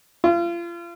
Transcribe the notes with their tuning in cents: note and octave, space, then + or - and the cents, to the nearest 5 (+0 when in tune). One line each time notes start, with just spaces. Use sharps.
F4 -35